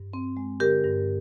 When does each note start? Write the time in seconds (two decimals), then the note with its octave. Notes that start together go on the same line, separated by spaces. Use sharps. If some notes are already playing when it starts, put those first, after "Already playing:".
Already playing: G2
0.14 C4
0.37 G#3
0.60 D3 G4 A#4
0.84 G2